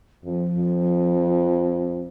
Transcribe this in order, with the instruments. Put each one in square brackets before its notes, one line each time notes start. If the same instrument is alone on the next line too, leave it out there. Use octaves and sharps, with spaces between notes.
[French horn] F2 [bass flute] F3
[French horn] F2